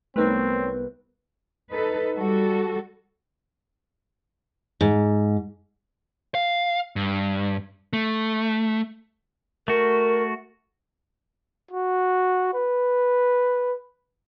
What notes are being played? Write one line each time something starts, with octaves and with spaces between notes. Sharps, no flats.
C2 A3 B3 C4 D#4 A#4 B4 C#5
D#4 A4 B4
G3 F#4 A4
G#2
F5
G2
A3
A3 F#4 A#4
F#4
B4